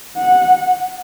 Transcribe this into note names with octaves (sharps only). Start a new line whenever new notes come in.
F#5